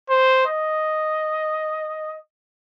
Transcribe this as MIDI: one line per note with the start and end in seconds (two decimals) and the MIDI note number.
0.10 0.46 72
0.47 2.17 75